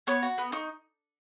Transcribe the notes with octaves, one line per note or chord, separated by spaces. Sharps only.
B3 C#5
F#4
B3
D#4 C#6